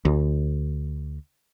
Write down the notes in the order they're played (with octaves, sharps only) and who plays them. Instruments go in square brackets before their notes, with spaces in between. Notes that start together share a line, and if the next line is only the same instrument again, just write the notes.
[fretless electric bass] D2